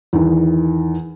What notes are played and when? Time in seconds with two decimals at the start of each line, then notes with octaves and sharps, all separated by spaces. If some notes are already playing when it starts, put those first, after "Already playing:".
0.13 E2 D#3